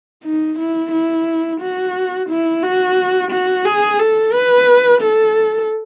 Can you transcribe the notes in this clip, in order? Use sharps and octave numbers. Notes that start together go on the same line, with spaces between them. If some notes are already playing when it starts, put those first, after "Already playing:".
D#4
E4
E4
F#4
E4
F#4
F#4
G#4
A4
B4
A4